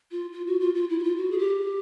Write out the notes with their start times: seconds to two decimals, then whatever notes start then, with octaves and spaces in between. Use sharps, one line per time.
0.11 F4
0.32 F4
0.47 F#4
0.60 F4
0.75 F4
0.90 E4
0.99 F#4
1.04 F4
1.17 F#4
1.31 G#4
1.38 G4